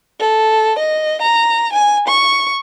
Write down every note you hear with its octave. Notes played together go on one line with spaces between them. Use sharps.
A4
D#5
A#5
G#5
C#6